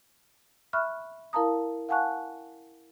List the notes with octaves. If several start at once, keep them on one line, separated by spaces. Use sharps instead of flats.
E5 B5 C#6 F6 F#6
E4 A#4 F5 A5 A#5 D#6
F5 F#5 G#5 A5 C#6 F#6